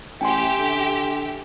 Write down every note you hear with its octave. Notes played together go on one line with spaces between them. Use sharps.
A1 G4 E5 G5 G#5 C6
D3